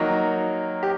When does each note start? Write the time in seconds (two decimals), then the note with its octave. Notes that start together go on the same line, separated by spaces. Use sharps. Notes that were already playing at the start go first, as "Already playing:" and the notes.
Already playing: D#3 F#3 A#3 D#4
0.83 G4